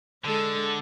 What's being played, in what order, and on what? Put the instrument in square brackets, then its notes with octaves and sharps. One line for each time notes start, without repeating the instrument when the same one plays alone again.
[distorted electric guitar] D3 [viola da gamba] G#3 A4